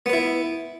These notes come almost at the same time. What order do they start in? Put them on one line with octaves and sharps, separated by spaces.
B3 B4 E4